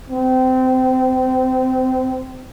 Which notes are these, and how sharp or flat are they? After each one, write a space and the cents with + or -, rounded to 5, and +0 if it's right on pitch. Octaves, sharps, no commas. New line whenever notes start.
C4 -25